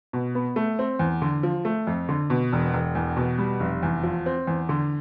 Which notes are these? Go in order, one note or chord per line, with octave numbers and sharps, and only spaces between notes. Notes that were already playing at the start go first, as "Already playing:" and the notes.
B2
B3
A3
C4
E2
D3
F3
A3
F2
D3
B2
E1
E1
E2
B2
G3
F1
E2
F3
C4
E2
D3